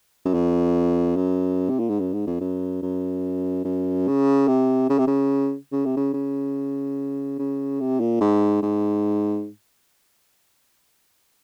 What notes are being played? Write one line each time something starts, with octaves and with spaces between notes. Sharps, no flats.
F#2
F2
F#2
C3
A#2
G#2
F#2
G#2
F2
F#2
F#2
F#2
C#3
C3
C#3
C3
C#3
C#3
C3
C#3
C#3
C#3
C3
A#2
G#2
G#2